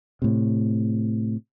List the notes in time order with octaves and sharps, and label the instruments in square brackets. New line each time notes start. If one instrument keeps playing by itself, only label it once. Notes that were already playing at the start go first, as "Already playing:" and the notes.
[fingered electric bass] A2 C3